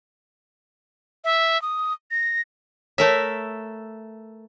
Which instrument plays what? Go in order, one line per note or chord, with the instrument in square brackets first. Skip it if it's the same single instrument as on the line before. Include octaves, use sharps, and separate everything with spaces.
[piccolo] E5
D#6
A#6
[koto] A3 A#4 E5 [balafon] C#5